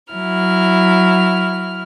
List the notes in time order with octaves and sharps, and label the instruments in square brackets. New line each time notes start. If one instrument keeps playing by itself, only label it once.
[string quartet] F#3 E4 F6